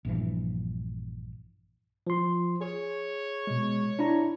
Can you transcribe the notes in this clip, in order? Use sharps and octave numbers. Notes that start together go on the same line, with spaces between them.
A#1 G2 E3 F3
F3 C6
G#4 C#5
B2 G#3
D4 E4 A#5